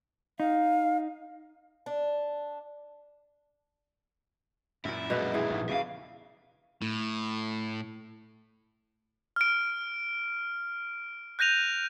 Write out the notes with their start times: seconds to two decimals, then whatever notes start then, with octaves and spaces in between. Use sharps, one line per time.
0.40 D#4 F5
1.86 D4
4.85 F#2 A#2 E4
5.10 F2 B2 G#3 B3 E5
5.34 E3 G#4
5.50 A#1 G#2
5.69 E2 C#3 E5 F5
6.82 A2
9.36 F6 D7
11.39 F#6 G6 A#6 D#7 F7